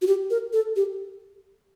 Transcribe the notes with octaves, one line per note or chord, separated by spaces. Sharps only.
F#4
G4
A#4
A4
G4